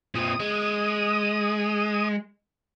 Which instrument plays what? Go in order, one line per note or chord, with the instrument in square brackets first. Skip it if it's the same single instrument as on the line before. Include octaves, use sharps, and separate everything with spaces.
[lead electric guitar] A#2 C4 [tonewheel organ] D#6
[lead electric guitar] G#3